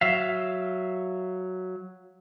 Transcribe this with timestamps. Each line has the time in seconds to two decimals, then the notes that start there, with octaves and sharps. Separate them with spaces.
0.01 F#3 E5 F5